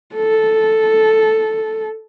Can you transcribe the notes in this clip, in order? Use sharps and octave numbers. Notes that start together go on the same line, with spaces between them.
A4